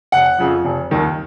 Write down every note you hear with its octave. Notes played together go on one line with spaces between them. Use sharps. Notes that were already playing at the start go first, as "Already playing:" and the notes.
F1 F#5
F2 C#3 F3
F1
D#2 D#3